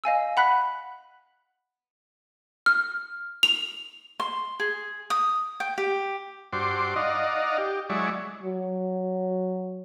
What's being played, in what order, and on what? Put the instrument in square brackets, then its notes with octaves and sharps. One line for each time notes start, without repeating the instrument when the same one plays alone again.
[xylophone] D#5 F5 G#5 E6
F#5 B5 F#6 B6
F6
F7
[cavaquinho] C6
G#4
D#6
G5
G4
[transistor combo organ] G2 F#4 C5 C6 D6
D#4 D5 D#5 F5 F#5
G4
F#3 G#3 E4 D5 C#6
[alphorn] F#3